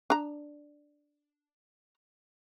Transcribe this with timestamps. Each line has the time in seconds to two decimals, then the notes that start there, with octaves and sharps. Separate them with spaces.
0.10 D4 A#5